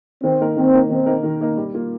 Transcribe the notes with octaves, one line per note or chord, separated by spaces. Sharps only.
D#3 C4
A#3 D#4 A#4
D#3 C4
A#3 D#4 A#4
D#3 C4
A#3 D#4 A#4
D#3
A#3 D#4 A#4
G3
A#3 F4